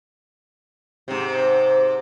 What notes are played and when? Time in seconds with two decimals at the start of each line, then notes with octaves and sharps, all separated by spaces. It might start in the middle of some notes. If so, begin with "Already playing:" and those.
1.08 G#2 C3